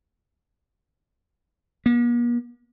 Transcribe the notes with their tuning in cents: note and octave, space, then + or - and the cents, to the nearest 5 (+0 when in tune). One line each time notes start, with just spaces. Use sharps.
A#3 +45